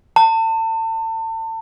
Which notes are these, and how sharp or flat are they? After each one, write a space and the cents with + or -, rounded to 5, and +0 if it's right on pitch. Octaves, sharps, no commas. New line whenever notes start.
A5 +35